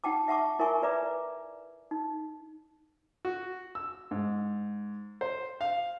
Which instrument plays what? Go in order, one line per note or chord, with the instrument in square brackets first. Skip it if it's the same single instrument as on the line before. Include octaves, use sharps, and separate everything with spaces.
[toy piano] D#4 F#5 G5 A5 D6
E5 F#5 A5 C#6 D6
E4 A#4 E5 G#5 C#6
G#4 B4 D5 E5 A#5 D6
D#4
[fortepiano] F#4
E6
G#2
C5
F5